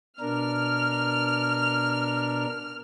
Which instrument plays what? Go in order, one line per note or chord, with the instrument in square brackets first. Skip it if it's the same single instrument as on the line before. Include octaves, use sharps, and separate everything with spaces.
[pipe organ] B2 D4 A#4 [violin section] F6